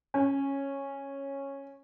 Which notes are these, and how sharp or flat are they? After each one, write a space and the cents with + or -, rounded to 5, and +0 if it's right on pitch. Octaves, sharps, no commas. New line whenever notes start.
C#4 -10